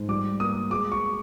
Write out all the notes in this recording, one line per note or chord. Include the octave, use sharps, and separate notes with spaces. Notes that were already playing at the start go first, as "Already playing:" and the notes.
Already playing: G#2
G3 D6
A#3 D#6
G#3 D6
C#6